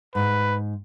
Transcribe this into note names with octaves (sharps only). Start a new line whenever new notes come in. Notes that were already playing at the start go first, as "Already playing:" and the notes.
G#2 B4